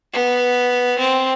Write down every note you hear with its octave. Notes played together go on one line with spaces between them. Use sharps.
B3
C4